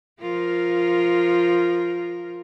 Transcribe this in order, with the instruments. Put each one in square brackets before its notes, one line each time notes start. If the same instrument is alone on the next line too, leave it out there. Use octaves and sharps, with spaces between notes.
[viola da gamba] F3 F4 A#4